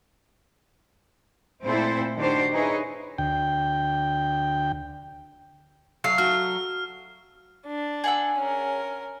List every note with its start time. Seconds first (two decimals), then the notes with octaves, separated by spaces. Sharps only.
1.63 A#2 A3 C4 E4 A4 C5
2.16 D#3 D4 F#4 G4 C5
2.52 D#4 E4 G#4 B4 C#5 D#5
3.18 D2 G5
6.04 F#3 A3 F5 C7
6.18 F#4 F6
7.66 D4
8.04 G#4 F#5 E6
8.39 C#4 A#4